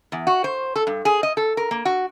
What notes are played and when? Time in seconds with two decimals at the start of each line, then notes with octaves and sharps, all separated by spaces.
0.12 E2
0.27 F#4
0.44 C5
0.76 A4
0.87 G2
1.05 G#4
1.23 D#5
1.37 A4
1.57 A#4
1.71 A#3
1.85 F#4